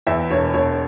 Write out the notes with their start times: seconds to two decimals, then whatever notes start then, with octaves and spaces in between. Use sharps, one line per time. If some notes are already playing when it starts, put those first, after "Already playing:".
0.07 E2 E5
0.31 E1 C#5
0.54 E1 C#5